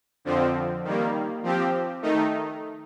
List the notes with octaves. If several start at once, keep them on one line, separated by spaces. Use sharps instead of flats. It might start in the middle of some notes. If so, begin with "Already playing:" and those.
F2 D3 F3 C4
D#3 G3 A#3
F3 C4 G4
D#3 A3 D#4